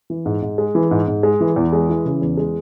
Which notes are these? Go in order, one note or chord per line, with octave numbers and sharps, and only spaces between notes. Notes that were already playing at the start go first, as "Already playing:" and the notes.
E3
G#2
G#2
G#3
E3
G#2
G#2
G#3
E3
E2
G#3
E3
C#3
E2
G#3